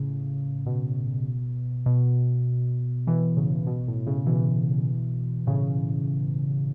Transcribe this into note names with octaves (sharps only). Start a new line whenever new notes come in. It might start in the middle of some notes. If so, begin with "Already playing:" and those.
Already playing: A2 C#3
B2
B2
B2 E3
A2 C#3
B2
A2
A2 C#3
B2 E3
A2 C#3